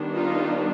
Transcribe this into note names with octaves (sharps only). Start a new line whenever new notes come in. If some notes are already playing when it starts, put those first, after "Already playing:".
Already playing: D#3 G3 B3 D4
D#4 F4